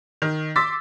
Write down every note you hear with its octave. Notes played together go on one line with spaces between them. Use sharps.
D#3
C6 D6 E6 A6 B6